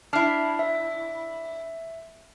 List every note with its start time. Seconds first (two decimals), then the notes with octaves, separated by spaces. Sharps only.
0.13 D4 E4 A5 F6 C7
0.59 E5